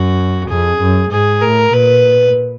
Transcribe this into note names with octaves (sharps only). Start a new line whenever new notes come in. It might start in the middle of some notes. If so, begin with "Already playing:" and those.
Already playing: F#2 F#4
F2 G#4
F#2
G#2 G#4
A2 A#4
A#2 B4